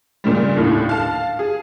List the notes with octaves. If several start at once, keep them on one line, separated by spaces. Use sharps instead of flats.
A#2 C#3 G3
D#2 A2 D3
F5 A5
G#4